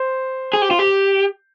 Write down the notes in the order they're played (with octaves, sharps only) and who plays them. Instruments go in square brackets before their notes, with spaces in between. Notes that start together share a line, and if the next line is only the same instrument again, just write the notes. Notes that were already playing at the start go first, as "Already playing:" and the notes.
Already playing: [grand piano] C5
[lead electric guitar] G#4
G4
F4
G4